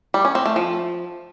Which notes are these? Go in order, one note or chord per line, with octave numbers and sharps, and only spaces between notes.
G3
C#4
C4
A3
F3